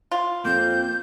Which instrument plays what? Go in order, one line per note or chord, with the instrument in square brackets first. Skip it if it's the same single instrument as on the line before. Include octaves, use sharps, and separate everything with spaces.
[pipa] F4
[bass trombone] F2 [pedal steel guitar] A#3 C4 [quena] G6